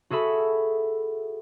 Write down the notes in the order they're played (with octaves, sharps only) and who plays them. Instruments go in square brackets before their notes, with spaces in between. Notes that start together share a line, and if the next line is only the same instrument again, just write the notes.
[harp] F#4 G#4 A4 E5 B5